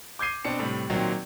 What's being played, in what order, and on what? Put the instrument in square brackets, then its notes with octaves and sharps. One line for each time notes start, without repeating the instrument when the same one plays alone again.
[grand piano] D6 G6 G#6 C7 D#7
B2 C4 D4 C#7
A2 C3 G3
A#2 D#3 F#3 A#3 C4